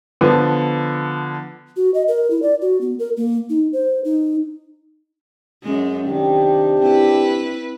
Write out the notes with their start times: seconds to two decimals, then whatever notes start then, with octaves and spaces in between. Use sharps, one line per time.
0.21 D3 F3 B3
1.77 F#4
1.94 D#5
2.08 A#4
2.31 E4
2.43 D5
2.62 F#4
2.81 B3
2.99 A#4
3.17 A#3
3.50 D#4
3.73 C5
4.05 D#4
5.63 F#2 G#3
6.08 C3 D#3 D4 G4
6.82 C4 E4 B4